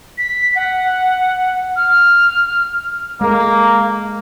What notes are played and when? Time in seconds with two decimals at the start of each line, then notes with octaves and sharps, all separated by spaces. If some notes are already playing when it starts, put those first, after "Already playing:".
0.18 B6
0.56 F#5
1.76 F6
3.21 G#3 A#3 A4